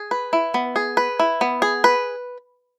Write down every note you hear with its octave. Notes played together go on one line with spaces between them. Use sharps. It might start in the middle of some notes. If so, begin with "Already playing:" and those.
Already playing: G#4
B4
E4
B3
G#4
B4
E4
B3
G#4
B4